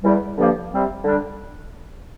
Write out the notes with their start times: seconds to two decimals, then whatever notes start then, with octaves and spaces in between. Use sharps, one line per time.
0.03 E2 E3 G3
0.38 G2 D3 F3 A#3
0.71 C3 G3 C4
1.05 D3 G3 D4